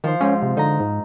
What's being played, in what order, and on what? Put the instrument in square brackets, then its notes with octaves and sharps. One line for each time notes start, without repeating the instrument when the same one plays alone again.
[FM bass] D#3 [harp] F3 C5
[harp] G#2 [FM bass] C#4
[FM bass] C3
[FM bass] D3 [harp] D#4 A#5
[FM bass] G#2